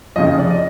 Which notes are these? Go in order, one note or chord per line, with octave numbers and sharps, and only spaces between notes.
F1 F2 C#3 F3 D#5
D#5
D5
D#5